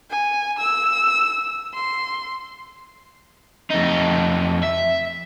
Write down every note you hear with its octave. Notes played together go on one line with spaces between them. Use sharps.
G#5
E6
C6
F2 D#4
E5